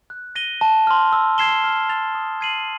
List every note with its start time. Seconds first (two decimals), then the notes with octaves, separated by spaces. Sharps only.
0.10 F#6
0.35 A#6 D#7 G7
0.61 A5
0.87 C6 F6
1.13 E6
1.38 G#6 C7 E7 G7
1.64 F6
1.89 A6 C7 F7
2.15 D#6
2.41 G#6 C7 D#7 F#7